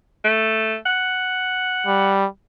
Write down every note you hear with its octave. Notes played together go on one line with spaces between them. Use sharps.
A3
F#5
G3